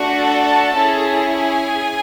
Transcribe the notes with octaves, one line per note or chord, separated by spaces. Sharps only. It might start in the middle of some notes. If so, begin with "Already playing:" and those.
Already playing: A3 D4 F#4
A4 A5
C#4 E4 G#4
G#4 G#5